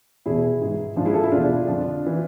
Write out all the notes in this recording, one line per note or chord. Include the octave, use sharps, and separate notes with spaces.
E2 B2 E4 G#4
G#2 E3
G#2 F3 D4 F4
E4 G#4
F4 A4
E4 G#4
E2 B2 D4 F4
F2 D3 F3
E3